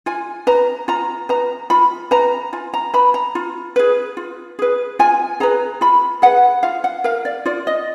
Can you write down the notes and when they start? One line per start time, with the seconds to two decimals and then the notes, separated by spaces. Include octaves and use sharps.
0.06 F4 G#5
0.47 B4 A#5
0.88 F4 A#5
1.29 B4 A#5
1.70 F4 B5
2.11 B4 A#5
2.53 F4 G#5
2.74 A#5
2.94 B4 B5
3.14 A#5
3.35 F4
3.76 G#4 B4
4.17 F4
4.59 G#4 B4
4.99 F4 G#5
5.40 G#4 B4 A#5
5.81 F4 B5
6.22 G#4 B4 F#5
6.63 F4 F5
6.84 F#5
7.04 A#4 F5
7.25 D5
7.46 F4 D5
7.67 D#5